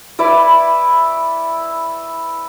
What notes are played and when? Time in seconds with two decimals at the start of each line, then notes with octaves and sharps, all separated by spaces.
0.19 E4 B4 D5